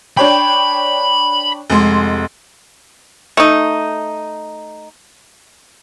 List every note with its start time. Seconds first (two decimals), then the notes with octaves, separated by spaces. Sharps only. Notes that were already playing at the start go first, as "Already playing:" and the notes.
0.17 D4 C#5 G5 B5
1.70 F1 G#3 C6
3.37 A3 D#4